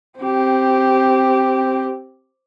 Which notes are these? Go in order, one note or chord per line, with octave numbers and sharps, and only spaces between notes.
C4 G4